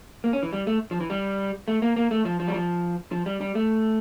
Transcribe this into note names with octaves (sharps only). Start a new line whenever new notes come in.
A#3
C#4
E3
G3
A3
F3
E3
G3
A3
A#3
A#3
A3
F3
F3
G3
F3
F3
G3
G3
A3